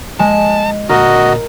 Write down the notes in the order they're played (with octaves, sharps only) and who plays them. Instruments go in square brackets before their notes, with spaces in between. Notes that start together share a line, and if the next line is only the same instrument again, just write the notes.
[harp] G#3 [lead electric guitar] A5
[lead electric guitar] A#2 D3 [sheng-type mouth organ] F#4 D#5 [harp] A#4